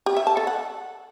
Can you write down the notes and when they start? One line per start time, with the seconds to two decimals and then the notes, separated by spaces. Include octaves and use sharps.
0.06 G4
0.17 E5
0.27 A5
0.37 A4
0.47 F#5